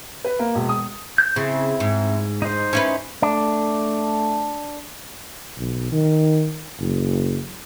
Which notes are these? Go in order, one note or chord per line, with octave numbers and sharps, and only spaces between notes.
B4
A#3
E1
D#6
G6
C#3 C4 E4
G#2
D#4 C5
C#4 E4 B4
A3 D4
B1
D#3
F#1